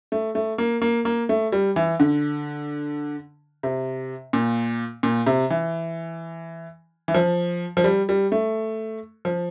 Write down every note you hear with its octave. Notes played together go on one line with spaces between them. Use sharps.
A3
A3
A#3
A#3
A#3
A3
G3
E3
D3
C3
A#2
A#2
C3
E3
E3
F3
F3
G3
G3
A3
F3